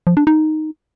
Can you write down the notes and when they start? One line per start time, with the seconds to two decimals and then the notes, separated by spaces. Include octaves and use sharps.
0.07 F3
0.17 D4
0.27 D#4